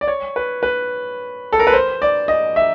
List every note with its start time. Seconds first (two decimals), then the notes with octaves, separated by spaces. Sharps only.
0.01 D5
0.08 C#5
0.36 B4
0.63 B4
1.53 A4
1.59 A#4
1.67 B4
1.73 C5
2.02 D5
2.28 D#5
2.56 E5